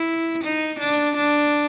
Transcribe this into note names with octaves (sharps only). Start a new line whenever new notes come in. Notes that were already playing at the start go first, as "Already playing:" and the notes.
Already playing: E4
D#4
D4
D4